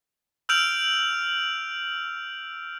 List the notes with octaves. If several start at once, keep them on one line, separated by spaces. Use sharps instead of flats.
E6 F6 G6 D7 F7 F#7